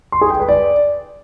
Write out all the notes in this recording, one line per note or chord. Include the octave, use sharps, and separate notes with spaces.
C6
G#4
G5
B4
D5